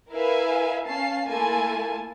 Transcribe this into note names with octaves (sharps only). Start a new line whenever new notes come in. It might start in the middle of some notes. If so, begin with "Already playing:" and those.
E4 A#4 B4 E5 F5 G#5
C#4 F5 A5 C7
A3 A#3 E4 F4 G#5 A5